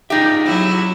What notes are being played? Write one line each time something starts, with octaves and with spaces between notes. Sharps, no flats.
D#4 F4 G4 G#4 E5
F#3 E4 F#4